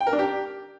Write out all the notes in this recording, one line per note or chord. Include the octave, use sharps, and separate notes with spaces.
G5
A#4
D4
G4